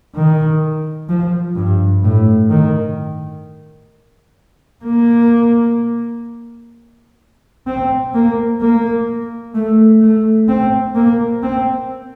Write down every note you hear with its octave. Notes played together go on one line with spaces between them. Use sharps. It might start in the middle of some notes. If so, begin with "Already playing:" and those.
D#3
F3
G2
A2
D#3
A#3
C4
A#3
A#3
A3
A3
C4
A#3
C4